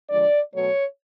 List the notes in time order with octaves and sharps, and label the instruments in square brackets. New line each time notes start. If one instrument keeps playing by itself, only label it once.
[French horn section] D3 F3 G#3 D4 D5
B2 F#3 A3 C#5